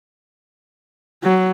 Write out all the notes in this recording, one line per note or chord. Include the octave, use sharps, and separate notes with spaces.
F#3